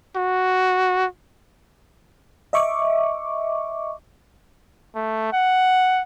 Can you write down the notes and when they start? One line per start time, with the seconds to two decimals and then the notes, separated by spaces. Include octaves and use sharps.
0.16 F#4
2.53 D#5 E5 C#6 D6
4.96 A3
5.33 F#5